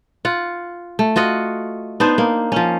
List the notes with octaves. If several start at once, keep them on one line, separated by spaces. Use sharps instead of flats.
F4 F#5
A3
F4 F#4 D#5 F#5
B3 D4 D#4 C5
A#3
F3 C#4